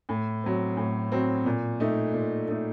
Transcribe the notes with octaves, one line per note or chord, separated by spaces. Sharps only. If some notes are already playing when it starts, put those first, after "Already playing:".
A2
F#3 C4
A2
F#3 C4
A#2
A3 D#4
A#2
A3 D#4